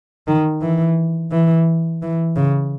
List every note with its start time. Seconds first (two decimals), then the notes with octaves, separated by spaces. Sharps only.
0.27 D#3
0.61 E3
1.31 E3
2.02 E3
2.36 C#3